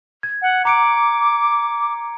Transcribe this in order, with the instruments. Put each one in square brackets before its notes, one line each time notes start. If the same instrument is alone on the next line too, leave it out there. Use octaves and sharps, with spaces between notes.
[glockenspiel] G#6
[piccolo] F#5
[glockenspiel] A#5 C#7 D7 [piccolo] D6